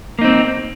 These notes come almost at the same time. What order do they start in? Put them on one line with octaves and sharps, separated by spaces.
A#3 D#4 C4